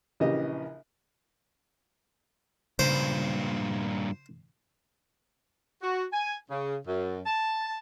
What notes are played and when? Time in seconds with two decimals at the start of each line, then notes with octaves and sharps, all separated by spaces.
0.20 A#1 C#3 E3 G4 D#5
2.79 G2 A#2 C#3 C5
5.83 F#4
6.13 G#5
6.51 C#3
6.87 F#2
7.26 A5